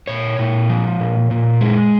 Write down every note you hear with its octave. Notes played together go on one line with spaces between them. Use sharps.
A#2 C#5
A#2
F3
A#2
A#2
G#3